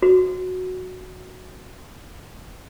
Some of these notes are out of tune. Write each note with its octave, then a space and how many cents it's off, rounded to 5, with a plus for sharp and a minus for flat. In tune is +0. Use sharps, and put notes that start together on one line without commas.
F#4 -10